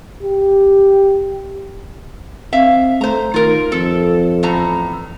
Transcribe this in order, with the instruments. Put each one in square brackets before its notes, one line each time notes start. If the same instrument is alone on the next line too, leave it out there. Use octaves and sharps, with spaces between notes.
[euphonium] G4
[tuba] C4 [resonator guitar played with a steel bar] E5 F5
[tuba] A3 [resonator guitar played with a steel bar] C5 A#5
[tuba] D#3 [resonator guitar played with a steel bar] F4 A#4
[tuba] F2 [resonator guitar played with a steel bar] A4
[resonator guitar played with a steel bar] E2 A2 A#5